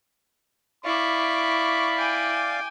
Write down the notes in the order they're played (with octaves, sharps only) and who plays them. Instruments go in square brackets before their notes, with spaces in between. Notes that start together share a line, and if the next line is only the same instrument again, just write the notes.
[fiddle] E4 [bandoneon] D5 F5 [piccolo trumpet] B5 [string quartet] C#6 D6
[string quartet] G5 G#5 D6